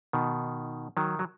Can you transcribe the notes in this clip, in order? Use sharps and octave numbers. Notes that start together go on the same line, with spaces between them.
B2 D#3
D#3 F#3
F#3